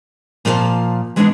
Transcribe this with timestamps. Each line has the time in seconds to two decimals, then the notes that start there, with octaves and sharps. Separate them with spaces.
0.45 A#2 F3 F4 G#4 F5 A5
1.16 E3 G#3 B3 C4 D4 D#4